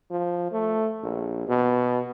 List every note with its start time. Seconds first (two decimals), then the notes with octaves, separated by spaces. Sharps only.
0.10 F3
0.52 A3
1.03 A#1
1.47 B2